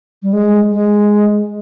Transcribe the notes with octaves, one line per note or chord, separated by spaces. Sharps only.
G3
G#3
G#3